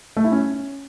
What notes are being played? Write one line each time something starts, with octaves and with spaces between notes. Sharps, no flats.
A3
E4
C#4